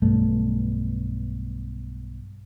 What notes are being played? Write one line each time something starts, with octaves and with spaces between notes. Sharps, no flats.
B1 G2 A3